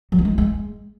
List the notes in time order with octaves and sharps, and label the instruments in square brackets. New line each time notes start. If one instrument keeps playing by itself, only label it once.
[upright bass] F#3
B3
G#3
E4
G#3